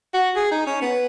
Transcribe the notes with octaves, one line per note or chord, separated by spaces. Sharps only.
F#4
G#4
D#4
C#4
B3